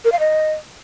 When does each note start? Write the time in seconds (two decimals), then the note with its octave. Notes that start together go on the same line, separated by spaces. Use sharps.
0.05 A#4
0.12 F5
0.19 D#5